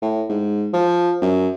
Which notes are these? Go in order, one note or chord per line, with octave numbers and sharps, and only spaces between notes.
A2
G#2
F3
F#2